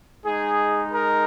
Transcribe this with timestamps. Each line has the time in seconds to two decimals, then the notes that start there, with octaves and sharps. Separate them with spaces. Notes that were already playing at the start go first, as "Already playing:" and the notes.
0.25 G#3 D#4 G#4
0.92 A#4